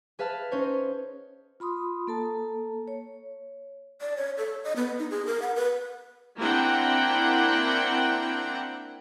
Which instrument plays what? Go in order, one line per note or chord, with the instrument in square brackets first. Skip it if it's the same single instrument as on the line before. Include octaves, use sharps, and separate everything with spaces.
[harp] G#4 B4 E5 F5 A5
C#4 D#4 C5 C#5
[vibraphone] F4 B5 C6 D#6
A#3 A4 A5
C#5
[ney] D5
C#5
A4
D#5
B3
D#4
G#4
A#4
F#5
B4
[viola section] A#3 C4 D4 E4 F#5 G5